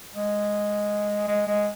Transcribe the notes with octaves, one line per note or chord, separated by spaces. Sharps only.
G#3
G#3
G#3